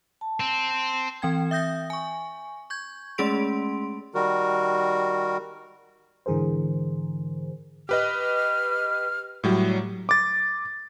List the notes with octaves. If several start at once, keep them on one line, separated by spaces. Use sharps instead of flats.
A5
C4
E3 C4 G5 G#6
E5 D#6 G6 A#6
G#5 C#6
C#6 G6 G#6
G#3 A3 C#4 G#4 C6 D7
D#3 G3 F#4 A#4
G#2 D3 E3 G#4 A#4 C5
G4 B4 D#5 F6
A2 F#3 G3
D6 A6